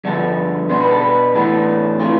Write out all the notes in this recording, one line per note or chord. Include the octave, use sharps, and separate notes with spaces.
G2 D3 F3 B3 D4 A4
B2 B3 D4 C5
B4
A4
B4
A2 E3 B3 D4 A4
C3 E3 A3 F4